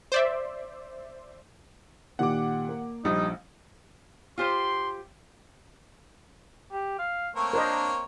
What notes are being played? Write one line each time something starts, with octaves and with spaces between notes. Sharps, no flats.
C5 D5 E5
A#2 D#3 G4 F#5 D6
A#3
A#1 G3 D#4
F4 G4 C5 C6
G4
F5
A3 A#3 C4 C#5
D4 A#4 C5 D#5